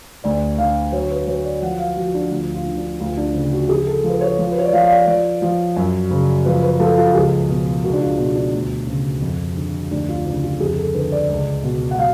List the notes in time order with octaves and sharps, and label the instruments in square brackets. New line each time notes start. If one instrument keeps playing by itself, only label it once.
[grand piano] D2 D5
D3 F5
F#3 C#5
B4
F#3 C#5
D5
F3 F#5
F5
F3 F#4
D4
D2 F4
F4
D3
D4
D2 F4
D4
C#3
F#4
F3 G#4
A4
F3
B4
C#5
F3
B4
C#5
D5
F3 F5
F5
D5
F3 D5
F3
F#2
C#3
F3 B4
B4
F3 A4
F4
C#2 G#4
B2
C#2 F#4
D4
F4
B2 F4
D4
D2
C#3
F2
D3
D2 D4
F4
C#3 D4
F4
F2 G#4
A4
D3 B4
D5
C#2
B2
F#5
F#3 F5